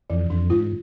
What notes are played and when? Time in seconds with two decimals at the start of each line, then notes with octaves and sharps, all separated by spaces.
0.10 F2 E3
0.30 F2 D4
0.50 G#2 F4